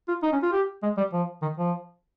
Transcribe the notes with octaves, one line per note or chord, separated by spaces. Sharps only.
F4
D#4
C#4
F4
G4
G#3
G3
F3
D#3
F3